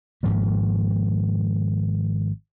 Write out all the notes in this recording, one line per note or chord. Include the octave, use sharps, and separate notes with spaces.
G#1 G#2 F3 A#3